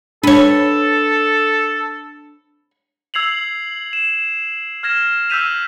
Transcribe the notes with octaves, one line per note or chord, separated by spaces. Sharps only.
D4 A4 B4 C#5
E6 G#6 C7 F7 F#7
E7
F6 G#6 A#6 E7
E6 F6 G6 B6 D#7 F7